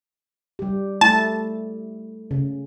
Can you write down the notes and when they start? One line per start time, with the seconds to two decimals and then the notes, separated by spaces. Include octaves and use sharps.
0.59 G3 G4
1.01 A3 E4 A5
2.31 C#3